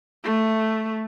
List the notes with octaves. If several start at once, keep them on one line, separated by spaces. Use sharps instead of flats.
A3